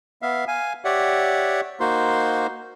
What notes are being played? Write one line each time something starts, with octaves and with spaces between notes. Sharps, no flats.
B3 E5 F5
F5 G#5
G4 C#5 D5 E5 F#5
A#3 D#4 F#4 C5 C6